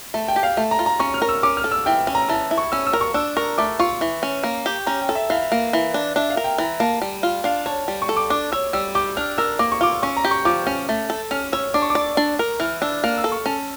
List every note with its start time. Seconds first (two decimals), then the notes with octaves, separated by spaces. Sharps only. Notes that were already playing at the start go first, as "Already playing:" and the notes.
0.14 A3 A5
0.28 G5
0.36 G4
0.43 F5
0.57 A3 A5
0.71 A#5
0.79 F4
0.86 A#5
1.00 C#4 C#6
1.14 F6
1.22 A#4
1.29 E6
1.43 C#4 D6
1.57 F6
1.64 A4
1.72 E6
1.86 E3 G5
2.07 C#4
2.15 A#5
2.29 E3 A5
2.51 E4
2.58 C#6
2.72 C#4 E6
2.87 E6
2.93 A#4
3.01 C#6
3.14 D4 E6
3.37 A#4 C#6
3.58 A3 D6
3.79 F4 C#6
4.01 E3
4.23 C#4
4.43 A#3
4.66 G4
4.86 C#4 A#5
5.01 G5
5.09 A4
5.15 E5
5.30 E3 F5
5.52 A#3
5.73 E3
5.94 D4
6.16 D4 E5
6.30 F5
6.37 A#4
6.44 G5
6.58 E3 A#5
6.80 A#3 A5
7.02 G3
7.23 F4
7.44 D4 F5
7.66 C#5 A5
7.88 G3
8.02 C#6
8.09 A4
8.17 D6
8.30 D4 D6
8.52 C#5 E6
8.73 G3 E6
8.95 G4 D6
9.17 D4 F6
9.38 A#4 E6
9.59 A#3 D6
9.72 C#6
9.81 F4 D6
10.03 C#4 C#6
10.17 A#5
10.24 G4
10.31 C#6
10.45 F3 D6
10.67 C#4
10.89 A3
11.10 A4
11.31 C#4 F6
11.53 C#5 E6
11.74 D4 D6
11.82 C#6
11.90 D6
11.95 D5
12.17 D4
12.39 A#4
12.60 E3 F6
12.82 D4 E6
13.04 A#3 F6
13.18 E6
13.24 A4
13.32 C#6
13.46 C#4 A5